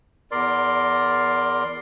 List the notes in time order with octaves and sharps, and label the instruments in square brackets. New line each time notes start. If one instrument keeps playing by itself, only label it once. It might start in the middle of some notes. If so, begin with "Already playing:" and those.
[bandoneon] E2 A#4 D5 C6